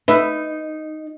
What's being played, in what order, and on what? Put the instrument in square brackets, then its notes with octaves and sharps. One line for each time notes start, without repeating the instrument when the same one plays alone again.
[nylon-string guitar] D#4 [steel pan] B4 E5